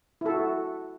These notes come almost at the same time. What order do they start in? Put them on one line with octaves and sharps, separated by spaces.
E4 A4 F#4